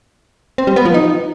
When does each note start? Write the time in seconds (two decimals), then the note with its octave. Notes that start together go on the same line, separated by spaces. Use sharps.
0.58 C4
0.67 G3
0.76 B3
0.85 F3
0.94 D#4